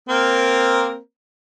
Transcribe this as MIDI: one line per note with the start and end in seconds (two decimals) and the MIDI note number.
0.09 0.98 58
0.09 0.98 60
0.09 0.98 70